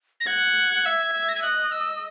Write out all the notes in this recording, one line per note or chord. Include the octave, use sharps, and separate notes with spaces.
A#6
F#5 G#6
E5
E5
A#6
G#6
D#5 F#6
E6